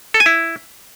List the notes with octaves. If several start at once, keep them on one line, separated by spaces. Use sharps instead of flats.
A4
G#5
E4